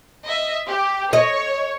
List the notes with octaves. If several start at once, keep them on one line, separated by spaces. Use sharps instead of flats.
D#5 E5
G4
C#5 D#5